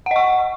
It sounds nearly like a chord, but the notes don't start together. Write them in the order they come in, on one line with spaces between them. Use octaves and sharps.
F#5 D#5 C#6